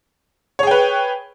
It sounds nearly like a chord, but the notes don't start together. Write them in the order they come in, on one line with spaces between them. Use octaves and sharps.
C#5 G#4 G5 B4